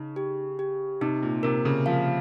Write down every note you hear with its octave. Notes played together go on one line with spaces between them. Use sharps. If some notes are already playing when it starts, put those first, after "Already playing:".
Already playing: C#3 D#4
G4
G4
C3 D#4
A#2
C3 A#4
C#3
F3 F5